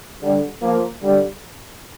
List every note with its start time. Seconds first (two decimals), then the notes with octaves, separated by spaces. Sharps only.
0.21 D3 G3
0.60 F3 A#3
1.01 D3 G3